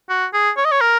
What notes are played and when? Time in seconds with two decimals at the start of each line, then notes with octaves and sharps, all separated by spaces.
0.10 F#4
0.34 G#4
0.57 C#5
0.65 D#5
0.72 C#5
0.81 A#4